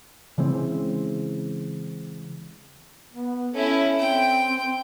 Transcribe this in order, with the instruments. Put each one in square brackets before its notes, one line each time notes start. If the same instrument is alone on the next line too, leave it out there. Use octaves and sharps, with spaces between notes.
[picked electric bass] C#3 E3 G#3 C4
[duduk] B3
[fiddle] C#4 E4 [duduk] A4
[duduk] C4 [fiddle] G5